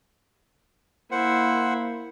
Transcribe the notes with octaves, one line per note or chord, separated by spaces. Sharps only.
A#3 E4 C5 F#5